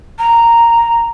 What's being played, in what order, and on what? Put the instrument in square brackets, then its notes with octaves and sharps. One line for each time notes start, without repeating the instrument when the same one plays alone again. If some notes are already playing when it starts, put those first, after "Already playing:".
[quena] A#5